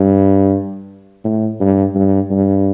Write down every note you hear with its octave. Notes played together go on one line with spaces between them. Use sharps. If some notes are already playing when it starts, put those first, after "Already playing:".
Already playing: G2
A2
G2
G2
G2